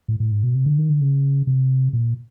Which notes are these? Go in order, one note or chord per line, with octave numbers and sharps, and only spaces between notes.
A2
A2
G#2
B2
C3
D3
D#3
D3
C#3
C3
A#2